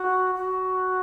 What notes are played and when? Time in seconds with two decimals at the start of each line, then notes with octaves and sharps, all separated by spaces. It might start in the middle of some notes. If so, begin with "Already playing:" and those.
Already playing: F#4
0.35 F#4